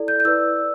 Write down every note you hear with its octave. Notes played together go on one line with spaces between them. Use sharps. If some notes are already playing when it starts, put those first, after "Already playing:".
Already playing: E4 A4 D5
G6
G6
E4 B4 D5 E6
D5